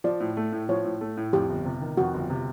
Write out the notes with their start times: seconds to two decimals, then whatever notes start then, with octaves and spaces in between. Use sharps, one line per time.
0.04 F3 D5
0.20 A2
0.37 A3
0.53 A2
0.69 F3 C#5
0.85 A2
1.01 A3
1.17 A2
1.33 F2 G4
1.49 G1
1.66 C3
1.81 D#3
1.97 F2 F#4
2.14 G1
2.30 C3